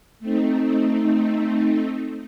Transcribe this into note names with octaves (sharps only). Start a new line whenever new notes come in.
A3 C4 D#4